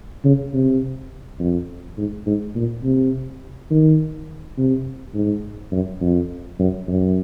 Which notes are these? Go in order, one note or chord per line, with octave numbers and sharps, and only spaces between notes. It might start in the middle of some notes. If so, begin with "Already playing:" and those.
C#3
C3
F2
G#2
G#2
A#2
C3
D#3
C3
G#2
F#2
F2
F#2
F#2